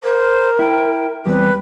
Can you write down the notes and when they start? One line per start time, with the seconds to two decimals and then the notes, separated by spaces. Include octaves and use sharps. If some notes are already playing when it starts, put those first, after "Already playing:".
0.03 A#4 C5
0.59 E4 G5
1.26 E2 G3 C4 B4